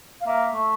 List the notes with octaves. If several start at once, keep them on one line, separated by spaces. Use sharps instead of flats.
F5
A#3 E5
A3